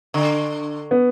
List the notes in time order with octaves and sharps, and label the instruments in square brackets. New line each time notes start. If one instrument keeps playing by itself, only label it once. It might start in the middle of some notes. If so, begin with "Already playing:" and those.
[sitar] D3
[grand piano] B3